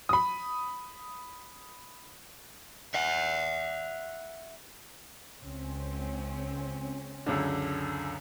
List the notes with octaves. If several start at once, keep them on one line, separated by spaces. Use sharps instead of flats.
B5 D#6
E5 F#5
C#2 C4 C#4
C#2 F#2 D3